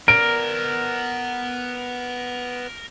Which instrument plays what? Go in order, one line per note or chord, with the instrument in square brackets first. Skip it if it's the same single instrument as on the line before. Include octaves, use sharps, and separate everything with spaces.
[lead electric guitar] B3 D5 [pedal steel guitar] A#4 [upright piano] D7